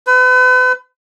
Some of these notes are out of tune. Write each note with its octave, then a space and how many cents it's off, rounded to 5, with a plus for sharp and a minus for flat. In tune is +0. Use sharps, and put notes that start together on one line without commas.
B4 +40